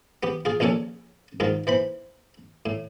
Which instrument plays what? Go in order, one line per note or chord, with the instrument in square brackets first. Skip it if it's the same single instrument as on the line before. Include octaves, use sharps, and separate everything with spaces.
[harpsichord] B3 G4
F4 G#4
A#1 A#2 C#4 A4 C#5
G#2 D#3 F4
E3 C5 B5
A2